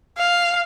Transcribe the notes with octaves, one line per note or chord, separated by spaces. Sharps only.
F5